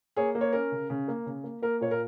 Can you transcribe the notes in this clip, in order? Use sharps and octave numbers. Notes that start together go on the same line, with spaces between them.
A#3 G#4 C#5
A#3
C#5
C#4 A#4
C#3
C#3
A#3
C#3
A#3
A#3 A#4
A#2 C#5
A#4